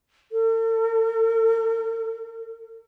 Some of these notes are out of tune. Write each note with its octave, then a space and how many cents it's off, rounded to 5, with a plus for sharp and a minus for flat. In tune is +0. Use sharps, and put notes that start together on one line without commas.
A4 +45